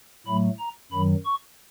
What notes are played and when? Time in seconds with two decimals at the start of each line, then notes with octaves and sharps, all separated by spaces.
0.26 A2 F#3 A3 B5
0.59 A#5
0.92 F#2 D#3 F#3 B5
1.25 C#6